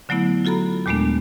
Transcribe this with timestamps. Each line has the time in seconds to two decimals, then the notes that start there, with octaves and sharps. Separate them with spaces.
0.09 D3 F#3 A3 B3 E4
0.45 F4 F#4 A4 A#5 B5
0.86 D#2 A#2 G#3 A3 B3 D4